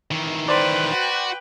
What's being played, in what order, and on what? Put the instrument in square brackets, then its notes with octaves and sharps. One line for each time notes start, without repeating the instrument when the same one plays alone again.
[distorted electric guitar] D#3 E3
[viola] B4 G5 [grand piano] C5 D5 C6
[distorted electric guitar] F#4